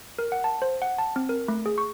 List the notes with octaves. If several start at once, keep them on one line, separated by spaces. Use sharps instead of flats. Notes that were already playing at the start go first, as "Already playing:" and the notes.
A#4
F#5
A5
C5
F#5
A5
C4
A#4
A3
G#4
C#6